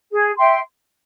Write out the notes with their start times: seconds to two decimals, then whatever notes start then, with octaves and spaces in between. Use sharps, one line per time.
0.11 G#4
0.36 E5 G5 C6